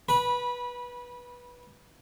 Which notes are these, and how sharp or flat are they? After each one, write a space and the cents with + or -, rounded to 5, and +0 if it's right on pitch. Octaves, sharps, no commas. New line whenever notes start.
B4 -15 B5 -25